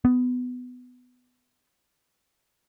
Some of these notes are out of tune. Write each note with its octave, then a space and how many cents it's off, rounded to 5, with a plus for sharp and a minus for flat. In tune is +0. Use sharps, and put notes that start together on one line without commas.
B3 +15